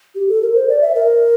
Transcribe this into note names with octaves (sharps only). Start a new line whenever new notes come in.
G4
A4
A#4
C5
D5
E5
A#4